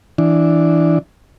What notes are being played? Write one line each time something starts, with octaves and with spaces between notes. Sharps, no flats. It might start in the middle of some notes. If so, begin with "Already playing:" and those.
E3 D4